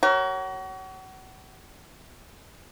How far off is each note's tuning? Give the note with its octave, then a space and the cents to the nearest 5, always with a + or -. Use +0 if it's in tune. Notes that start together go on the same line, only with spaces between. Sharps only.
F#4 +35 A#4 +0 C#5 +0